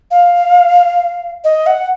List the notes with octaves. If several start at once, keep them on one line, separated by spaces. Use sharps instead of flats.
F5
D#5
F#5